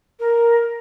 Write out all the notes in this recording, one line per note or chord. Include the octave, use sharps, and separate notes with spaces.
A#4